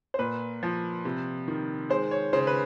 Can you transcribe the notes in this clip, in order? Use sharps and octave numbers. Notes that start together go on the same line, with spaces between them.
C5
A#2 B4
F3
C3
D#3
G#3 C5
C#5
C#3 C5
B4